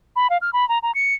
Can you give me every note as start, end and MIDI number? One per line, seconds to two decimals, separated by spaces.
0.16 0.27 83
0.30 0.38 77
0.41 0.50 89
0.53 0.67 83
0.69 0.78 82
0.83 0.91 82
0.95 1.14 97